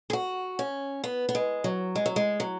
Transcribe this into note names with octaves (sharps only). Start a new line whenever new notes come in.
G#4
F#4
C#4
B3
B3
G#3
F#3
G#3
F#3
G#3
F#3